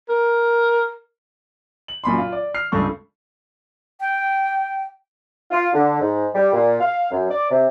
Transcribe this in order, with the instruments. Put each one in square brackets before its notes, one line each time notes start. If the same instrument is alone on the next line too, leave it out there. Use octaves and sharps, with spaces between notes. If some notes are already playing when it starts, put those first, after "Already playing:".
[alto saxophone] A#4
[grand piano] F#7
F#2 A#2 B5 C6
F4
D5
F6 C7
C#2 G2 A3 A4 C#6
[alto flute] G5
[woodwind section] F4
D3
G#2
G3
A#2
F5
F#2
D5
C3